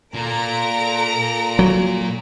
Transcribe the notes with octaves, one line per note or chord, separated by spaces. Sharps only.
A#2 A4 A#5 D7
F#3